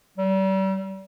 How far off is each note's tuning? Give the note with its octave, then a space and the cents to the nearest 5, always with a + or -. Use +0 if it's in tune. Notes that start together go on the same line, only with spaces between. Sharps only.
G3 -35